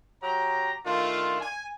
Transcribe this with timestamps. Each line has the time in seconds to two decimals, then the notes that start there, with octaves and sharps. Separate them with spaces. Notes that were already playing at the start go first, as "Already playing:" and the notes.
0.22 F#3 G4 A#5
0.86 D#3 A3 D4 F4
1.40 G#5